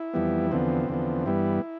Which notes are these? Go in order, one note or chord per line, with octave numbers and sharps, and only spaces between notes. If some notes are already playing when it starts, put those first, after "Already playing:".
Already playing: E4
F2 E3 G3 B3
E2 D3 F3 B3 C4
E2 D3 F3 B3
G2 E3 G3 B3 E4